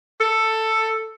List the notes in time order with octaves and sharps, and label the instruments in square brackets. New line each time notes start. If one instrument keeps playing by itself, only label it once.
[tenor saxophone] A4